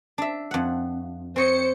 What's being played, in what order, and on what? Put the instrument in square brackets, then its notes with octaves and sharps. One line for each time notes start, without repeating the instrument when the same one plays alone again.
[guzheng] D4 E5
F2 F#5
[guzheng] C4 C#5 D#5 [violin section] C5 C#7